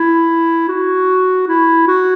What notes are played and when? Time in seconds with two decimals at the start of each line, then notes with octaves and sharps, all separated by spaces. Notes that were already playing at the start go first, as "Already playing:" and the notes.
Already playing: E4
0.69 F#4
1.48 E4
1.88 F#4